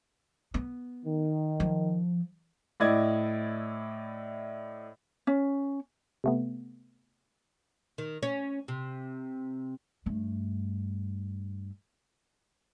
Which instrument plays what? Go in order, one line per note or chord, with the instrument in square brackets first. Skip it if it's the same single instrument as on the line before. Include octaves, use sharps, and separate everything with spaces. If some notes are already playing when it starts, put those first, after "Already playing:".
[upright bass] B3
[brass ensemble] D#3
[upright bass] F3
[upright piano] A2 E4 D5 D#5 G#6
[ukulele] C#4
[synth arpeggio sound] C3 A3 B3
[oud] D#3
C#4
C3
[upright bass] G2 A3